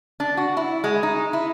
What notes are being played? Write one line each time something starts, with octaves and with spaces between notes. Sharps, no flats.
D4
F#4
E4
G#3
D#4
E4